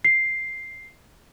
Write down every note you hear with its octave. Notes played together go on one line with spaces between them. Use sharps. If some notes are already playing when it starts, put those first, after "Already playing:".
C7